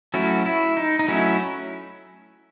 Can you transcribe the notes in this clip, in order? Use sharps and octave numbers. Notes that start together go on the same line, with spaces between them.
F#3 A3 C#4 E4 F#4
E4
D#4
D#4
F#3 A3 C#4 E4